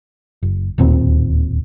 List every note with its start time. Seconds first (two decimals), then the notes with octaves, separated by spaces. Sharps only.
0.43 F#1
0.78 D1 D#2 A#2 C4